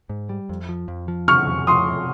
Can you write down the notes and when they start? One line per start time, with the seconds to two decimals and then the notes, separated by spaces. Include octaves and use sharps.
0.09 G#2
0.29 G3
0.49 F2
0.69 F3
0.88 F2
1.08 F3
1.28 C3 C#6 F6
1.48 F2
1.67 F3 C6 D#6
1.87 C3